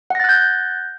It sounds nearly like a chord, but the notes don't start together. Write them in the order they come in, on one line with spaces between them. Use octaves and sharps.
F#5 A#6 A6 F#6 G6